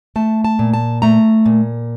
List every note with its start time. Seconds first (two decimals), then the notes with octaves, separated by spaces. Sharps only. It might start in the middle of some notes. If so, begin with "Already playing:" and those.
0.16 A3 A5
0.45 A5
0.59 A#2
0.74 A5
1.02 A3 A#5
1.46 A#2